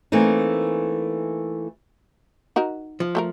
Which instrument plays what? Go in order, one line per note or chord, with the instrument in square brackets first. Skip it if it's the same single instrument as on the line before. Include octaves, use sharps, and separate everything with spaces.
[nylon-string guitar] E3 A3 A#3 C4 D#4
[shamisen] D#4 F#4 A#4
[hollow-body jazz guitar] F3
[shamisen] A3 A4 A#4